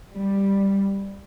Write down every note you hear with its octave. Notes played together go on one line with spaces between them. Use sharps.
G3